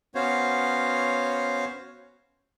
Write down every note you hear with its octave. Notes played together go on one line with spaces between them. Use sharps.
B3 C#4 F#4 C5 C#5 F5